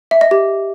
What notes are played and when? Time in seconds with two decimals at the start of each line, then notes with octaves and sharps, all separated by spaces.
0.11 E5
0.21 D#5
0.31 G4